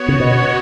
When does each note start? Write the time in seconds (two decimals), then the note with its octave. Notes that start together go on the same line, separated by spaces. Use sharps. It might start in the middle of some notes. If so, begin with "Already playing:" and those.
Already playing: B3 F#4 C#5
0.08 C#3
0.20 B2